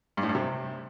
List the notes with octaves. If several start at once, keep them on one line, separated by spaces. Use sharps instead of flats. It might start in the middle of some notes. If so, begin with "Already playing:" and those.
G2
A2
G2
C3